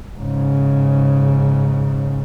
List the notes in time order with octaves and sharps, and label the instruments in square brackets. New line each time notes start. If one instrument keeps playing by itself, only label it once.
[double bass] G#2 C#3